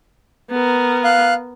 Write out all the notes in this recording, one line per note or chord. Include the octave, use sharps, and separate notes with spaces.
B3 A#4
F5 F#6